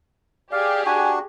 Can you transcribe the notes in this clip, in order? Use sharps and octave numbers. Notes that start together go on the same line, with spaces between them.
G4 G#4 D5 F5
D4 F#4 G#5